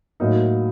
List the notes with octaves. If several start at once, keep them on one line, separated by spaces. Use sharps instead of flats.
A2 F#3 A#3 D#4